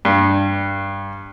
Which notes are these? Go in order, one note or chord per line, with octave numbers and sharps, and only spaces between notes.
G2